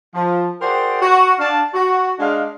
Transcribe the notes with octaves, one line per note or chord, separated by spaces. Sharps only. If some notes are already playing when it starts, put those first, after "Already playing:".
F3
F#4 G#4 A#4 C5 D5 G5
F#4
D4 F5 A5
F#4
G#3 D4 F5